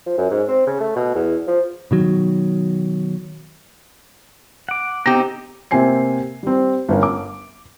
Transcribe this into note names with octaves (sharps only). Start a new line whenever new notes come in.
F3
F#2
G#2
C4
C#3
A3
B2
E2
F3
B2 D#3 F#3
F#5 D6
B3 C4 D#4 G4
C3 A#3 C4 C5 G#5 C7
G3 C4
G1 C#4 A#4
D6